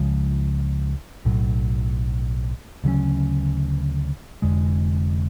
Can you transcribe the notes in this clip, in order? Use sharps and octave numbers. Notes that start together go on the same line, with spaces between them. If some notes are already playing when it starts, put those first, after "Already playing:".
Already playing: C#2 C#3 F3 G#3
B1 A2 F#3
D2 C#3 F#3 C#4
F1 F2 D3 G#3